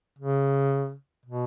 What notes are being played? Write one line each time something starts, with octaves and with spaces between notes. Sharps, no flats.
C#3
B2